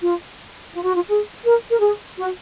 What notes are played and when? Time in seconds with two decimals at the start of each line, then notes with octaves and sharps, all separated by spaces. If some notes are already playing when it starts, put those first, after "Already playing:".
0.01 F4
0.72 F4
0.83 F#4
0.94 F4
1.08 G#4
1.44 A#4
1.70 A#4
1.79 G#4
2.16 F#4